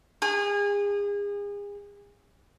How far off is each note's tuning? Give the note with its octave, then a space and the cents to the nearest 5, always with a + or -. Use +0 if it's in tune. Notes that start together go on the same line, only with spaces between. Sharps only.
G#4 -35